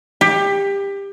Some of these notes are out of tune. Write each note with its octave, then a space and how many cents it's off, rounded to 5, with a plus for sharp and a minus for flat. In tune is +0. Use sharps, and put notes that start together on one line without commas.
G4 +20